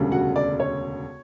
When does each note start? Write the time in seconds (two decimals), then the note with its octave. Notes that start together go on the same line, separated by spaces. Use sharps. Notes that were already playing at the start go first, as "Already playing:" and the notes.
Already playing: E1 D2 C#3 G3
0.11 F#4 F#5
0.36 D5
0.60 C#5